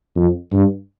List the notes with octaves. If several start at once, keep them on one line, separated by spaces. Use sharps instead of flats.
F2
G2